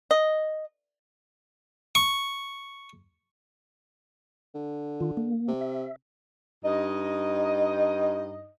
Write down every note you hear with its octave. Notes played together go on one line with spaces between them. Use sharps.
D#5
C#6
D3
D#3 F4
A#3
C3
E5
G2 D#4 D#5